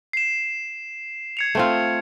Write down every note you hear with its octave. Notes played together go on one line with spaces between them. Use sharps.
C7 E7
G#6 C#7 F7
A3 C4 F4